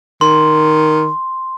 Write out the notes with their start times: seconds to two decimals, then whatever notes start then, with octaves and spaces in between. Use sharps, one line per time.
0.21 D#3 C6